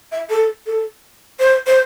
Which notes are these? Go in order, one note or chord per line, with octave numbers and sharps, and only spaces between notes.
E5
A4
A4
C5
C5